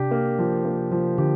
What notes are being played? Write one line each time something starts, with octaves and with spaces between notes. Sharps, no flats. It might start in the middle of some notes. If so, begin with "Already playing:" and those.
Already playing: C3 D4 G4
A#3
F3
A#3
F3
D3 G4